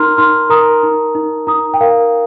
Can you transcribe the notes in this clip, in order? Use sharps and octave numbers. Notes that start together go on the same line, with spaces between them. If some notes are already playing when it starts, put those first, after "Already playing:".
Already playing: D#4 A#4 A#5 C6 F6
D#4 C6 F6
A#4 A#5 D#6
D#4
D#4
D#4 A#5 D#6
G5
A#4 F5